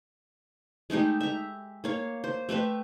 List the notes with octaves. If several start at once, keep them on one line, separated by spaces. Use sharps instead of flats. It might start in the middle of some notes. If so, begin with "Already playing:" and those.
G#3 A3 D#4 G4
E5 A#5
A#3 C#5 F5
C5
A3 G4 B4 E5